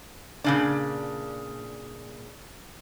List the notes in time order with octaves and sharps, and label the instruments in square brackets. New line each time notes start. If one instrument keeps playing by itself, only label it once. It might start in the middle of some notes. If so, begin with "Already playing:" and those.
[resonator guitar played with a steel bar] A#2 C#3 D4